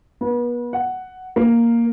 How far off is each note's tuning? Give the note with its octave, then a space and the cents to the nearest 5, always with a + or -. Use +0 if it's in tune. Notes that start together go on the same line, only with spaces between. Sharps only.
B3 -35
F#5 +5
A#3 +0